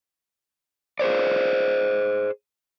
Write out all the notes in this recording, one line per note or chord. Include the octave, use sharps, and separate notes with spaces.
G#4 A#4 C5 D5